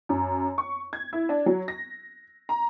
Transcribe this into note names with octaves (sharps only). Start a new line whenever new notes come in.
F#2
C#6
G#6
E4
D4
F#3
A#6
A#5